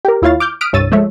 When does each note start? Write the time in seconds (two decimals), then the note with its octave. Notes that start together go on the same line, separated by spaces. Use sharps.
0.05 G4 A#4
0.22 D#2 E4 F4 C#5 F5 A6
0.40 D6 F6 G6
0.61 D#6 F6 F#6 B6 D7
0.73 C2 G2 C#5 E6 A6 D#7
0.92 F3 G#3 A3 C#5 E5